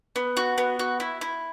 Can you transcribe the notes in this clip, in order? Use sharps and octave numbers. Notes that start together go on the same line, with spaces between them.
B3
F#4
B3
F#4
E4
E4